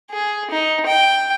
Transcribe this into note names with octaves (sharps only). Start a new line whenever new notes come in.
G#4
D#4
G5